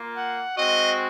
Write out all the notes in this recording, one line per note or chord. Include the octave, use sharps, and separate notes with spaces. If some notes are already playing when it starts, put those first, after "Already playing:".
Already playing: A#3 F4
F#5
G#3 C4 F#4 D#5